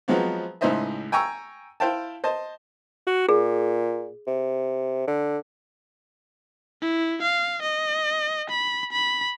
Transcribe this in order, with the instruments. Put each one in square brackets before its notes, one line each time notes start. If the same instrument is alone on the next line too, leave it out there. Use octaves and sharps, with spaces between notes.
[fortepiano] F3 F#3 G#3 B3 C4
C#2 A2 D#4 C5 D#5 E5
G5 G#5 A#5 C#6 E6
E4 C5 F5 G5 A5
C5 D#5 A5
[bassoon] F#4
[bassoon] A#2 [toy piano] G#4
[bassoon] C3
D3
[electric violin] E4
F5
D#5
B5
B5